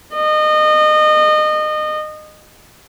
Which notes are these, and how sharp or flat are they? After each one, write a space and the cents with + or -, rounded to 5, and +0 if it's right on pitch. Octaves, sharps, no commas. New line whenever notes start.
D#5 -25